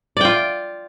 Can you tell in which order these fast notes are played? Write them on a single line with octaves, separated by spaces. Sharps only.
D5 G5 F4